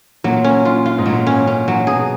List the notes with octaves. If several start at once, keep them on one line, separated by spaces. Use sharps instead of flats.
A#2 F#3
C#4
F4
F4
G#2
A#2 F#3
C#4
C#4
F#3
B2 G#4